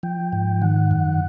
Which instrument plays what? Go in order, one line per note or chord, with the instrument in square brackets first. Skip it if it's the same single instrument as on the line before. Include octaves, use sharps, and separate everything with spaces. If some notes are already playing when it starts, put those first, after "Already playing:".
[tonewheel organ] F3 G5
G#2
D#3 F#5
F#2